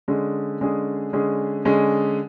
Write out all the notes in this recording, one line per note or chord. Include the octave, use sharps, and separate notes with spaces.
D3 G#3 C#4 G#4
D3 G#3 C#4 G#4
D3 G#3 C#4 G#4
D3 G#3 C#4 G#4